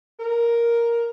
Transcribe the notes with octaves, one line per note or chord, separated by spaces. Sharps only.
A#4